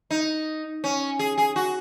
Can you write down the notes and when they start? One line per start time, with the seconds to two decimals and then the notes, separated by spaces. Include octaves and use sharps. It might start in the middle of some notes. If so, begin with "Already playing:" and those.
0.11 D#4
0.84 C#4
1.19 G#4
1.38 G#4
1.56 F#4